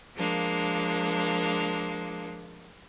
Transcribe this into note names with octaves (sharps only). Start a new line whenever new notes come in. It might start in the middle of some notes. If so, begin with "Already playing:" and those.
F3 G#3 A#3 D4